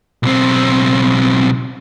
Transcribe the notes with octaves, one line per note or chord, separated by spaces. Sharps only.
B1 C4